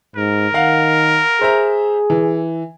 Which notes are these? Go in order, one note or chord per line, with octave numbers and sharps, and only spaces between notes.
G#2 A#4
D#3 F5 F#5
G#4 C5 E5 A#5
E3